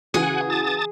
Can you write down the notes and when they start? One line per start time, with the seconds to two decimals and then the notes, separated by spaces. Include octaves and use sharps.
0.14 C#3 E3 F#4 G#4 F#5 G#5
0.50 A5 D#6 A6